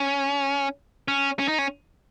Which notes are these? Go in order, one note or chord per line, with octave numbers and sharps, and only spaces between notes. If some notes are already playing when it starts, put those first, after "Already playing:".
Already playing: C#4
C#4
C#4
D#4
C#4